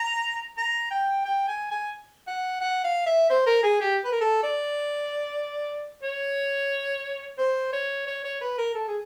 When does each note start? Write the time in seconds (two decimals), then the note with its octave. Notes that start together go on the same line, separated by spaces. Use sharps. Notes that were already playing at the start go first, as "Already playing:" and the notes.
Already playing: A#5
0.57 A#5
0.91 G5
1.25 G5
1.48 G#5
1.71 G#5
2.27 F#5
2.61 F#5
2.84 F5
3.06 E5
3.30 C5
3.46 A#4
3.63 G#4
3.81 G4
4.05 B4
4.12 A#4
4.21 A4
4.43 D5
6.03 C#5
7.38 C5
7.73 C#5
8.07 C#5
8.25 C#5
8.41 B4
8.58 A#4
8.74 A4
8.88 G#4